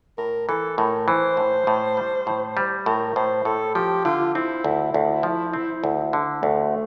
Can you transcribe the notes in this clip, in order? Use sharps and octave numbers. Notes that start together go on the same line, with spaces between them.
A2 A#4
E3 A4
A2 A#4
E3 C5
A2
A2
G3
A2
G3
A2 A#4
A2 C5
A2 A4
F3 G4
D3 F4
C4 E4
D2
D2
F3
C4
D2
D3
D2 A3